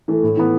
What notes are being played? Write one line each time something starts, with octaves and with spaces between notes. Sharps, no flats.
E3 A3
A2
E3 B3